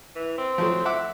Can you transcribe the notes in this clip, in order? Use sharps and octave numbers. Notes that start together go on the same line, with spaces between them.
E3
C4
F3 F#3 A3
E5 F#5 D6